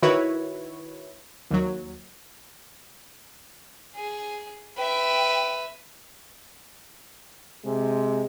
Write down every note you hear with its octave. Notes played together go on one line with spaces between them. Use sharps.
D#3 E4 F#4 B4 C#5
D#2 F#3
G#4
B4 E5 G5
C3 G#3